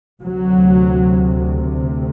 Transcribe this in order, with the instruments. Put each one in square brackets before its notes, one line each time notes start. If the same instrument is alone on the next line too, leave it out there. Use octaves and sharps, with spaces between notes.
[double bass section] D2 C3 F#3